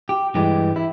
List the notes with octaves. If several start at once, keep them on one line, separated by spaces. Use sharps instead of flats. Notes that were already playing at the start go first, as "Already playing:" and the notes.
G4
G2 E3 G#3 G4
E4